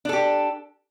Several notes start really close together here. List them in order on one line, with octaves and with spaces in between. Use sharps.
D4 A4 G4